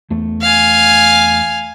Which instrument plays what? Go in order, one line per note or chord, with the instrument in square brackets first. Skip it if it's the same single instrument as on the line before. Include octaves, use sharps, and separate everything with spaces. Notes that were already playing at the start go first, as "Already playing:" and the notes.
[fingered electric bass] E2 A3
[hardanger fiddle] F5 G#5